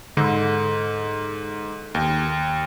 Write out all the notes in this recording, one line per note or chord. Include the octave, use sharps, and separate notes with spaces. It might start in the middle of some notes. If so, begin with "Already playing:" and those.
G#2 D3
D#2